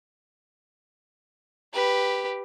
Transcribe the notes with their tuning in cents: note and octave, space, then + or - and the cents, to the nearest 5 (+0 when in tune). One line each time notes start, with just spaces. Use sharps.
G4 +0 B4 +0